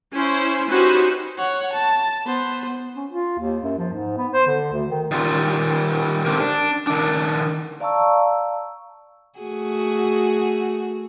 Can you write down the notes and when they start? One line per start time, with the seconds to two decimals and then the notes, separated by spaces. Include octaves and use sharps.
0.14 C#4 E4 C5
0.69 C#4 D#4 F#4 G4 B4 C5
1.38 C#5 F#5
1.73 A5
2.26 B3 C5
2.96 C#4
3.11 F4
3.39 D#2
3.64 F#2
3.78 F3
3.93 G#2
4.18 B3
4.33 C5
4.47 D3
4.72 D2
4.90 D#3
5.11 D#3 G3 F4
6.26 D3 C4 G4 A#4
6.40 D4
6.87 D#3 D4
7.80 D5 F5 A5 A#5 C#6 E6
9.39 A3 F#4 G#4